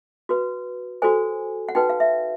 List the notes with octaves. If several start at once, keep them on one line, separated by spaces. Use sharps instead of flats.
F#4 B4
F#4 A4 C5 G#5
F#5
D#4 F#4 B4 G5
F5
E5